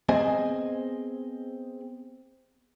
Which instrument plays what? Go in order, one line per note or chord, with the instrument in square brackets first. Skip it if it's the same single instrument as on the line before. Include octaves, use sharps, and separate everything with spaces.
[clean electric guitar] B3 C4 G#4 C5 D#5 G#5